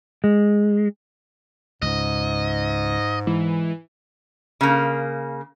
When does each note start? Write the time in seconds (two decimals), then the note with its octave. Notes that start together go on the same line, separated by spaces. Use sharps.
0.24 G#3
1.82 C#2 G#2 D#5
3.27 E3 G#3
4.61 C#3 A#3